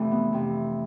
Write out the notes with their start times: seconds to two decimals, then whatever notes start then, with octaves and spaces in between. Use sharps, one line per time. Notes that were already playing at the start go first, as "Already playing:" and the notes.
Already playing: F2 C3 E3 A3 D4
0.11 B3
0.32 F2 C3 E3